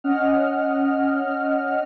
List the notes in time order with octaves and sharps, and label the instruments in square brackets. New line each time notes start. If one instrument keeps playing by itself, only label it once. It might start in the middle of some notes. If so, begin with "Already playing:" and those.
[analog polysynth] C#4 D#5 F#5 F6